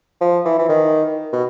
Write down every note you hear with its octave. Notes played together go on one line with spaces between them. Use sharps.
F3
E3
E3
D#3
B2